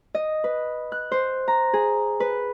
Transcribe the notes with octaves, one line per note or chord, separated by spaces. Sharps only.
D#5
B4
F#6
C5
A#5
G#4
B4